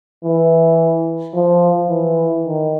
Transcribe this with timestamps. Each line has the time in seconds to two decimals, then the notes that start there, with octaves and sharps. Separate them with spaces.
0.25 E3
1.34 F3
1.89 E3
2.44 D#3